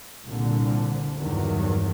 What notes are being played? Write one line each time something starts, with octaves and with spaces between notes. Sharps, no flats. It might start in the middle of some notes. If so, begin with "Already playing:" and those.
C2 A#2 D3
E2 G2 D#3 F#3